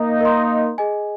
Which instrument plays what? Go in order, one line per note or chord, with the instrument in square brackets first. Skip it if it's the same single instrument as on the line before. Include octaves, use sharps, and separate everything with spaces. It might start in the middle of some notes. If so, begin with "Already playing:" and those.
Already playing: [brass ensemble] A#3 D#4
[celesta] A#4 D#5 C6
G#4 D#5 G#5